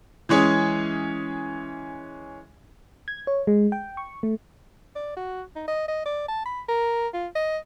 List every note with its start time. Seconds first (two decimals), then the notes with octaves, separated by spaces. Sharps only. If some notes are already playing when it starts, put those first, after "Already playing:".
0.29 E3 G#3 C#4 G#4
3.08 G#6
3.27 C#5
3.47 G#3
3.72 G5
3.97 C#6
4.23 A3
4.96 D5
5.16 F#4
5.56 D#4
5.68 D#5
5.88 D#5
6.05 D5
6.28 A5
6.45 B5
6.68 A#4
7.14 F4
7.35 D#5